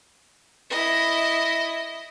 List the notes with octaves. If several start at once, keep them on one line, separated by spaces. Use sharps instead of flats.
E4 D#5